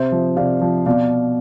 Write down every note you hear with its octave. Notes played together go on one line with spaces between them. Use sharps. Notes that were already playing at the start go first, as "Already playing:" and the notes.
Already playing: C3 C5 E5
F3
C3 D5 F5
F3
B2 D5 F5